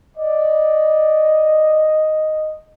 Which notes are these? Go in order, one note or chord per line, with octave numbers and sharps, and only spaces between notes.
D5 D#5